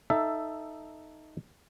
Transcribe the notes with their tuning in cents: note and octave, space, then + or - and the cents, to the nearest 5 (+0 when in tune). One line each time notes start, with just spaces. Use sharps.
D#4 +0 A4 +0 E5 +15